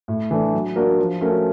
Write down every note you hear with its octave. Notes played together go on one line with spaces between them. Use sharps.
A2
E3 A3 D4
F#3
A#3 D4 F#4 A#4
F3
A3 C#4 F#4 A#4